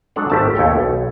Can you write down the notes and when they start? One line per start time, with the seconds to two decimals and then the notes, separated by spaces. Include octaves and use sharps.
0.16 F#3 G#3 D4 A4 C#5 F#5
0.30 G#1 A3 G4 A5
0.55 D#2 A3 C#5 G5
0.76 B1